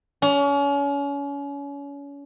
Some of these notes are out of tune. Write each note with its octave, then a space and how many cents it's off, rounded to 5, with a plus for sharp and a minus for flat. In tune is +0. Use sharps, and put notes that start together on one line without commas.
C#4 +35